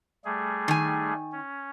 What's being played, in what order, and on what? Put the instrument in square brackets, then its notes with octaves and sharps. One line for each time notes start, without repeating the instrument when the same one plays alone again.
[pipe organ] G3 A3 G#4
[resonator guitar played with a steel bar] D#3 G#5
[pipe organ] C#4